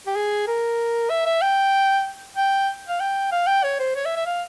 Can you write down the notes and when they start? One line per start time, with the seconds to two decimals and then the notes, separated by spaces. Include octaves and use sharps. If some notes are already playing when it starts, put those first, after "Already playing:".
0.06 G4
0.15 G#4
0.47 A#4
1.10 E5
1.26 E5
1.41 G5
2.36 G5
2.88 F5
3.00 G5
3.32 F5
3.47 G5
3.63 C#5
3.79 C5
3.95 C#5
4.05 E5
4.16 E5
4.26 F5